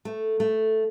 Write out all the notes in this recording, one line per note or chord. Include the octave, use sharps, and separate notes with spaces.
A3
A3